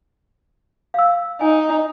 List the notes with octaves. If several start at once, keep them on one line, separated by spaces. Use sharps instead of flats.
F5 E6
D#4 G#5